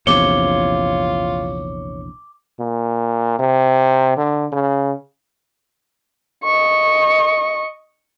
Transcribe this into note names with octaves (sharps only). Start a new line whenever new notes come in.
A#1 E2 C3 F4 C#5 D6 G7
A#2
C3
D3
C#3
D#5 C#6